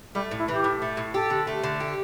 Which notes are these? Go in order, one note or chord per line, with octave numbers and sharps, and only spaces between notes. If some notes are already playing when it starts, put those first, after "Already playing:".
G3 A3
A2
E4
E3 G4
A2
A3
A2
G4 A4
D3
A3
D3
G4